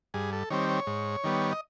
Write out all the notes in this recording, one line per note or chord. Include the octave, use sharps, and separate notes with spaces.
G2 G#4
A4
D#3 G3 C4 C#5
C#5
G#2
D#3 G3 B3
D#5